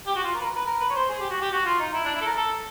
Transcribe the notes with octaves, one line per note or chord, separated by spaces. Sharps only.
G4
F#4
F4
A#4
B4
A#4
B4
A#4
B4
C#5
C5
G#4
G4
F#4
G4
F#4
F4
D#4
E4
D4
E4
A4
A#4
A4